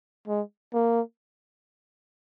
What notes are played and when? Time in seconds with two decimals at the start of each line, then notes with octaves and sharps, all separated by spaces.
0.28 G#3
0.74 A#3